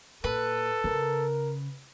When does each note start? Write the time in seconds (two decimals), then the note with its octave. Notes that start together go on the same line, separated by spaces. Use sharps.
0.24 A#2 A4 B4
0.84 C#3 A#4